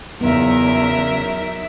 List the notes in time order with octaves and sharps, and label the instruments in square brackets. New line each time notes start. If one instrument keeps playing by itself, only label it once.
[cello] E2 [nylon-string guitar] C#3 B3 [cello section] F#3 D#4 E5 [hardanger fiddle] A#4